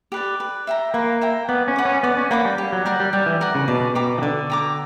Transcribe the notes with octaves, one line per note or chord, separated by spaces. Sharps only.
G4 B4 D5
B4
E5 G5 A#5
A#3 B4
E5 G5 A#5
B3 D5
C#4
F#5 B5 D6
C#4
B3 D5
C#4
A#3 F#5 B5 D6
G3
G4
F#3
G3 A#4 D5 F#5
G3
G3 G4
E3
A#4 D5 F#5
C#3
B2 D5
B2 G5 A#5 D6
E3
D3 D5
G5 A#5 D6